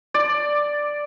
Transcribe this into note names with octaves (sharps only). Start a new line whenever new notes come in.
D5